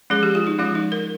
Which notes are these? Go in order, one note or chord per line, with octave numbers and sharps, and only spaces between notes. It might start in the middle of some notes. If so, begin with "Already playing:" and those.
F3 G#3 C#4 G#4
G4
F4
D#4
F3 G#3 C#4 F4
D#4
A#4